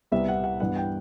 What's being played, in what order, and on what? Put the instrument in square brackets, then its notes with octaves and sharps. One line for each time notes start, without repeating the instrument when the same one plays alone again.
[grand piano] C2 C3 G3 B3 E5
F#5
F#5
G2 E3 B3 F#5
G5